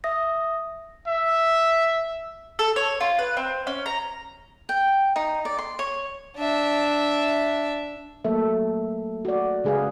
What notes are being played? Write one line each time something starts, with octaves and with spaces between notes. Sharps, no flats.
E5 D#6 A#6
E5
A4
C#5
F4
B4
C4
C#4
A#5
G5
D#4
D5
C6
C#5
D4 E5
F#3 A3 A#3 A4 E5
F#4 D5
C#3 G#3 G#4 B4 F5